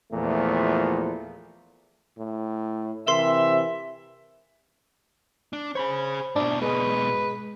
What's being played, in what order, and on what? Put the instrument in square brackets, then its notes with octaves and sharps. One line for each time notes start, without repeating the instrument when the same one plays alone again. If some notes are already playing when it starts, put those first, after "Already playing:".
[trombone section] E2 A#2 F3 A3
[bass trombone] A2
[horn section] C3 E5 [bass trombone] E3 [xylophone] A#4 C6 C7
[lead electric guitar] D4
[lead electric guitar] G#4 C#5 [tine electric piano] C5 B5
[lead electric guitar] G#2 B2 [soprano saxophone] D4
[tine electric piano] G#3 G#4 [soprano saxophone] B4